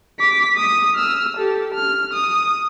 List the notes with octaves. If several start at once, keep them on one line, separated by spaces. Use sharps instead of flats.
D6 B6
D#6
E6 F6
G4 A4
F6
D#6